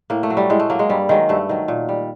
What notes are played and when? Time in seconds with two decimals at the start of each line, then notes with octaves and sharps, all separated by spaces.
0.10 A2 A#3
0.23 A3
0.30 F#3
0.37 G3
0.50 A2 G#3
0.59 A3
0.70 F#3 A#3
0.79 G#3
0.89 G2 G3
1.09 D#3 F#3 G#3
1.29 G2 A3
1.49 D#3 F#3
1.68 A#2
1.89 G3